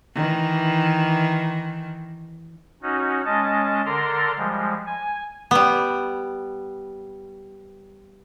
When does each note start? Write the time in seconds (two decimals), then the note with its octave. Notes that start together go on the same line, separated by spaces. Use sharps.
0.15 D#3 E3
2.82 C#4 D#4 F#4
3.25 G#3 C#4 D#5 A5
3.86 D3 A4 A#4 D5 A#5 C6
4.37 F3 G3 G#3
4.86 G#5
5.51 G3 B3